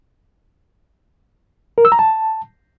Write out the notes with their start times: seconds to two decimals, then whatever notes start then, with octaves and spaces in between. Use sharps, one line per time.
1.78 A#4
1.85 E6
1.92 A#5
1.99 A5